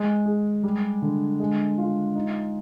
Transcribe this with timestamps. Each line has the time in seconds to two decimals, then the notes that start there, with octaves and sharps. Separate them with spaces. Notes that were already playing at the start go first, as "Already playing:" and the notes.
Already playing: G#3
0.26 G#4
0.63 G3
1.02 D3
1.40 G#3
1.78 F4
2.15 D#4